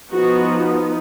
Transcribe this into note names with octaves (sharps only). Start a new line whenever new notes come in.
F3 B3 D#4 F#4